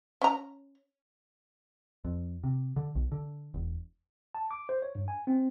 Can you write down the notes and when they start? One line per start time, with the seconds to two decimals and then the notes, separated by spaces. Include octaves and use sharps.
0.22 C#4 A#5
2.04 F2
2.44 C3
2.76 D3
2.95 B1
3.12 D3
3.54 E1
4.35 A5
4.51 D6
4.69 C5
4.82 C#5
4.95 G2
5.08 G#5
5.27 C4